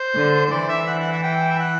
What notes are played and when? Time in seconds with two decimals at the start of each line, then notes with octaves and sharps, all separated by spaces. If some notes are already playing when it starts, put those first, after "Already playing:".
Already playing: C5
0.15 D3
0.45 C5
0.51 E3 D5
0.69 E5
0.88 F#5
1.00 F#5
1.12 E5
1.23 G5
1.50 E5
1.60 F#5